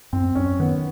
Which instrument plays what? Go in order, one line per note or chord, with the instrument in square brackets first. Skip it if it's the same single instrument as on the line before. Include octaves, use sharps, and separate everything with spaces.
[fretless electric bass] F#2 [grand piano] C4
[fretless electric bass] F#2 [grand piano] C#4
[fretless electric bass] D#3 [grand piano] B3